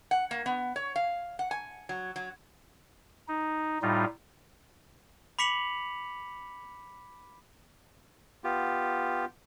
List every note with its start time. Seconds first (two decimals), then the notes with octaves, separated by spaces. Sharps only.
0.11 F#5
0.31 A#3
0.46 B3
0.76 C#5
0.96 F5
1.39 F#5
1.51 G#5
1.89 F#3
2.16 F#3
3.28 D#4
3.82 A2 G3 D#4 F4
5.39 B5 D6 B6 C#7 F7 F#7
8.44 B3 F4 G4